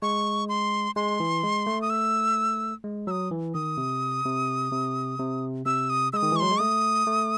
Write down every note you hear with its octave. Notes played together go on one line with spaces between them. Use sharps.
G#3 C#6
C6
G#3 C6
E3
G#3
A3
D#6
E6
G#3
F#3 D#6 E6
E3
D#3 D#6
C3
C3
C3
C3
C3 E6
D#6
G#3 D#6 E6
D#3
E3 C#6
F#3 C6
G#3
A3 D#6
A3